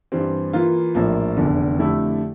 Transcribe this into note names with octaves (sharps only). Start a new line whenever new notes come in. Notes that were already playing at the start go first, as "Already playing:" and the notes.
G2 E3 G3 C4
E3 A#3 F4
A#1 A2 F3 A#3
F1 E2 D3
F2 D3 A3 E4 G4